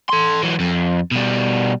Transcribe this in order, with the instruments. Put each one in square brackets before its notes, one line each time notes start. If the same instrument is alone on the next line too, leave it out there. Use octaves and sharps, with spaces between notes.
[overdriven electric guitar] A4 C6
E3 F#3
F2
B2 G3